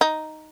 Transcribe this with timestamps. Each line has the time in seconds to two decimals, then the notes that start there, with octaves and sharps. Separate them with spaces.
0.01 D#4